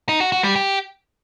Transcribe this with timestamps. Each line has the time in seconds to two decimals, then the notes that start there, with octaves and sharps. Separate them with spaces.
0.09 D#4
0.20 F#4
0.32 F#4
0.44 G3
0.56 G4